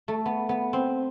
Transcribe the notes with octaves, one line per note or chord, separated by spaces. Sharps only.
A3
B3
B3
C4